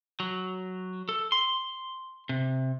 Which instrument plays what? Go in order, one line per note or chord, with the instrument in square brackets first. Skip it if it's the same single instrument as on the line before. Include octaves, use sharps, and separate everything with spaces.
[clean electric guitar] F#3
A4
C6
C3